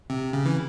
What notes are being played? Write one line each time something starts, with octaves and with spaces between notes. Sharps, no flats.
C3
C#3
E3